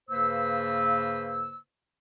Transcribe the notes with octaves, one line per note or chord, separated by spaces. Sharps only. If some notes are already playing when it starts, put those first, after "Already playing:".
G2 C#3 A#3 B4 C5 E6